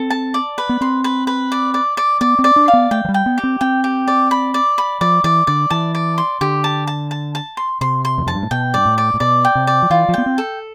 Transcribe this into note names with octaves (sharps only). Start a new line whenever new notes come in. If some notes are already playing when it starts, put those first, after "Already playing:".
Already playing: C4 A4
A5
D5
B4
B3
C4 C6
B4
B4
D5
D5
D5
B3 D5
C4
D5
D4
F5
B3
A3 G5
F3
G3
G5
B3
G4
C4
C4 G5
G4
D5
B5
D5
B5
F3 D5
E3 D5
D3 D5
E3 A5
D5
C6
D3 G4
A5
A5
A5
A5
C6
C3 C6
C6
E2
F2 A5
G2
A2
B2 G5
G2 D5
A2
D5
A2
B2 D5
G5
C3
D5
F3
E3 F4
F3
B3 G5
C4
A4